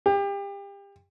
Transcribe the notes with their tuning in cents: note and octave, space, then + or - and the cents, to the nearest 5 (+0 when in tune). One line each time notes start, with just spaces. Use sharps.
G4 +30